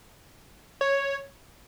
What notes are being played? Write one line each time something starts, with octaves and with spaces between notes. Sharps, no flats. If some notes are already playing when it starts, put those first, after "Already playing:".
C#5